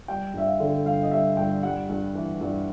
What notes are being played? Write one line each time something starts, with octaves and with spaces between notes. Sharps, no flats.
G3 G5
G2 E5
F5
D3
G2 F5
D#5
G3 E5
G2 G5
G3 F#5
G2
E3
G2